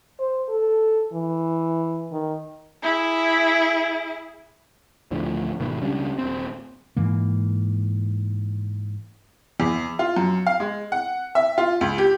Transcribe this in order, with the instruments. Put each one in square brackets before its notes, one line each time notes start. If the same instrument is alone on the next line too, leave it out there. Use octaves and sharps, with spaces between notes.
[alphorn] C5
A4
E3
D#3
[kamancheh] E4 G#4
[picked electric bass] D2 A2 D3 F3
G#1 B2 D#3 B3
C#2 G3 C#4 D4
D#1 C4
[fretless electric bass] G#2 E3 A#3
[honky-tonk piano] E2
F4
F#2
F5
G#3
F#5
E5
F4
C#2
G4